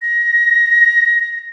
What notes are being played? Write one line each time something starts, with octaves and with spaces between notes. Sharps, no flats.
A#6